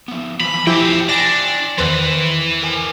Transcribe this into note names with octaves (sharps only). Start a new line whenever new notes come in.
F3 B3
E3 F3 B5
E2 F3 E4 G4 C5 E5 G5 G#5
D4 D5 G5 G#5 A#6 D7
E2 D#3 E3 B4 C5
A#4 G5 G#5